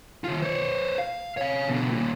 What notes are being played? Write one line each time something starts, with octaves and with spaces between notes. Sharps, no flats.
D#3 F4
C5 C#5
F5
C#5 F5
B2 D3
D#2 A#2